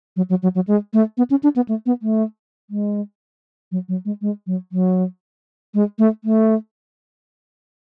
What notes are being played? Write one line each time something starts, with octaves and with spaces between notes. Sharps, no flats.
F#3
F#3
F#3
F#3
G#3
A3
B3
C#4
D4
B3
A3
B3
A3
G#3
F#3
F#3
G#3
G#3
F#3
F#3
G#3
A3
A3